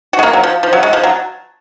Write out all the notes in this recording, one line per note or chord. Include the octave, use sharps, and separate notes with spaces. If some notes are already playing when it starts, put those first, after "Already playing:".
F#4
G#3
A#3
F#3
F3
F3
F#3
G#3
F3
F#3